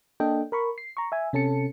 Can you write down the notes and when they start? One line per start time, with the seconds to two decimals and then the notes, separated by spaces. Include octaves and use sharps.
0.20 A#3 D4 A4 D#5 G5
0.52 A#4 B5 C#6
0.78 C7
0.97 A#5 C#6
1.12 E5 G#5
1.33 C3 C#4 A4 A5 C#7